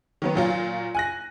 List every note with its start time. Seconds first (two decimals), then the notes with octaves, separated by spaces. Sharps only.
0.22 D#3 F#3 B3
0.35 A#2 F#3 F4
0.95 G#5 F#6 A#6